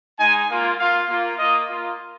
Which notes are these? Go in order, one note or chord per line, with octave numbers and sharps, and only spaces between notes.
G#3 D#4 G#5
A#3 F4
A#3 F4 F5
A#3 F4
A#3 F4 D#5
A#3 F4